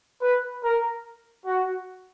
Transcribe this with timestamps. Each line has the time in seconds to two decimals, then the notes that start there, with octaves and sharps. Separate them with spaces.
0.21 B4
0.63 A#4
1.46 F#4